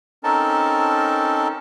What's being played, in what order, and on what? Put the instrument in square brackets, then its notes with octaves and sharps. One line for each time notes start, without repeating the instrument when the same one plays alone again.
[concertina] C4 C#4 D#4 A4 A#4 A5